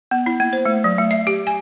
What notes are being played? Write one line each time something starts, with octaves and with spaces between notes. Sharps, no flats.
B3
E4
A#3
C5
A3
F#3
A3
E5
G4
G#5